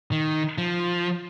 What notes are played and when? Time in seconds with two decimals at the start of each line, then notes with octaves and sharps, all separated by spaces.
0.12 D#3
0.58 F3